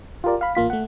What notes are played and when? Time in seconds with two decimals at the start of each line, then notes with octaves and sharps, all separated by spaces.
0.24 F4 G4 A#4 D5
0.41 F5 B5
0.55 A1 A#3 F4 B6
0.70 A3 F#5